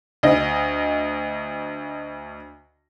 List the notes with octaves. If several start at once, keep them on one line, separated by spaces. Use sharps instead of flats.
D2 D#5